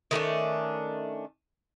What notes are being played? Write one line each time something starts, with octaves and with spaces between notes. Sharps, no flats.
D#3 A3 C#4 D4